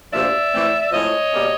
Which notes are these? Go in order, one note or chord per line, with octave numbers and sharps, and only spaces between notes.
D2 C3 F3 A#3 D4 D5 E5
A2 E3 A3 C4
A2 F3 G#3 C4 C#5 D#5
B2 G3 A#3 C#4